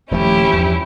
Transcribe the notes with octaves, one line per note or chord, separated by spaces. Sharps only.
D#1 F3 A3 C#4 E4 G4
E2 G2 F3